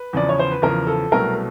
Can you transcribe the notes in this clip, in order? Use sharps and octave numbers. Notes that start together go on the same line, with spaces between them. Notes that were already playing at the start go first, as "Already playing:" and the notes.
Already playing: B4
E2 C#3 F3 D5
C#5
C5
B4
E2 C#3 F3 A#4
A4
C2 B2 F#3 A3 A#4